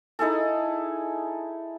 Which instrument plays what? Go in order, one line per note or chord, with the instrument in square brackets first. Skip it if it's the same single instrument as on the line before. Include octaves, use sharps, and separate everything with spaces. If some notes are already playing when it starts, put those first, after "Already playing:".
[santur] D#4 E4 G#4 A4